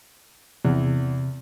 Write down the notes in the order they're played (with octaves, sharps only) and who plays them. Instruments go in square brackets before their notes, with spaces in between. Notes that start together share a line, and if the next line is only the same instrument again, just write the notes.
[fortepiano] E2 [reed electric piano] C3